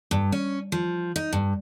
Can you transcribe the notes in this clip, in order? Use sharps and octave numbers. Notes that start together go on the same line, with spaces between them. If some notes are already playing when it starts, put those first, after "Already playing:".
G2
C#4
F3
D#4
G2